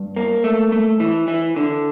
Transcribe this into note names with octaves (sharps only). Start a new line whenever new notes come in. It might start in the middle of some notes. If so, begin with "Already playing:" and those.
Already playing: G2
A#3
A3
A3
E3
E3
D3